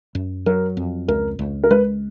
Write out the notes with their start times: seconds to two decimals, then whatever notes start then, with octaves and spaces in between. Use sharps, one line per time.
0.15 F#2
0.46 F#3 A#4
0.77 F2
1.08 C#2 A#4
1.39 C#2
1.64 A#4
1.71 G#3 B4